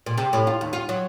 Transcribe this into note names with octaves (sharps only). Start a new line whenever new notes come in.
A#2
C3
A2
F4
D#2
F4
F#3